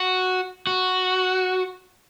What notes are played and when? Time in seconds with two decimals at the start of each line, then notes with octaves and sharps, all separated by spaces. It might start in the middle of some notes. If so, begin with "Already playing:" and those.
Already playing: F#4
0.67 F#4